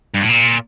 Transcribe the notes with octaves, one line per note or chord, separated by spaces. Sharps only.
G2
A2
A#2